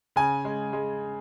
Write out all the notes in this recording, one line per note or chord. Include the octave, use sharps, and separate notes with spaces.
C#3 G#5
G#3
G#3